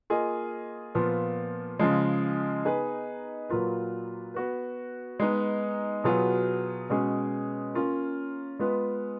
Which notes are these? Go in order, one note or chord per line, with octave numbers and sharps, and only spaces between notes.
A#3 F4 G#4 D#5
A#2 F3 B3
C#3 F3 G#3
B3 D#4 G#4 B4
A#2 F#3 A#3 F4 B4
B3 F#4 B4
G#3 B3 D#4
B2 F#3 B3 F4 G#4
B2 G#3 C#4 G#4
A#3 C#4 F4 A#4
G#3 B3 F4 B4